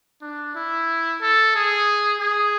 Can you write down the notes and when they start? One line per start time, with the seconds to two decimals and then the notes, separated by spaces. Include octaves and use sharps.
0.21 D4
0.55 E4
1.21 A4
1.55 G#4
2.20 G#4